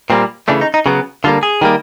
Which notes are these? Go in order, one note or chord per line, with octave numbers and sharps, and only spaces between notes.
A#2 G3 A#3 C4
C#3 E3 A3 D4
D#4
D#4
C#3 F#3 B3
D3 G3 A#3 F4
G#4
D#3 G3 A#3